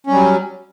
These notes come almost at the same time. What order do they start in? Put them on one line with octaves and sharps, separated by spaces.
C#4 G3 F#3